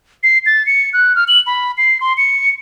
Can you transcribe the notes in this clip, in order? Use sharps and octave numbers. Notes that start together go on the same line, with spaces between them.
C7
A6
C#7
F#6
F6
F#7
B5
C7
C6
C#7